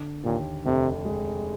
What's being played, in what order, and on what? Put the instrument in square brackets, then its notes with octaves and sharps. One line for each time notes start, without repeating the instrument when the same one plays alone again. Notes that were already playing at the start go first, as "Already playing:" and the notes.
Already playing: [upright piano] D3
[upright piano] D#2 [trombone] A#2
[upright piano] F1 [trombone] C3
[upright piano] G#3